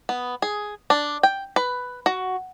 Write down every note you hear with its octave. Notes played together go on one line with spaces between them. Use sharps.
B3
G#4
D4
G5
B4
F#4